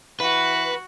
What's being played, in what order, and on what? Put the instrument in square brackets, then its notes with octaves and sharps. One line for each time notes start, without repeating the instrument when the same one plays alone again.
[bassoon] E3 [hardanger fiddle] F#4 [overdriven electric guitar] B4